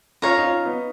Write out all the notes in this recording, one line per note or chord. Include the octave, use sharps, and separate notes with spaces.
C#4 F4 C#5 F5 A#5
D#4
C#4 F4
B3 D#4